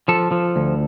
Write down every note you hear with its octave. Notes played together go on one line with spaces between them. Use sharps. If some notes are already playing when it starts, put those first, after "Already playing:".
F3 A4
F3
D2